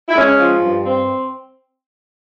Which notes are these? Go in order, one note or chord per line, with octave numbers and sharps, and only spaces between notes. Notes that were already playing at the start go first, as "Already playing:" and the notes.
E4
G#3 C#4
F3
G2
C4